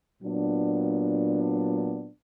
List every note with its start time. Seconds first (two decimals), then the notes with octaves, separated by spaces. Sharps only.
0.22 A#2 F#3 B3 D4